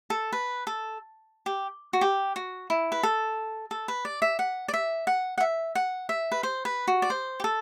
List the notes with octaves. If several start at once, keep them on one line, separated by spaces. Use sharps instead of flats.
A4
B4
A4
G4
F#4
G4
F#4
E4
B4
A4
A4
B4
D5
E5
F#5
D5
E5
F#5
F#5
E5
F#5
E5
B4
C5
B4
F#4
D5
C5
G4
A4